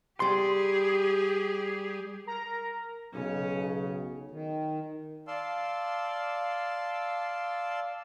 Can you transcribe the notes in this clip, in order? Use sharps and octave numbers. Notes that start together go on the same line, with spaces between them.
G3 G4 G#4 C6
A#4 A#5
B1 C#3 C#4 C#5
D#3
D5 F5 A5 C6 E6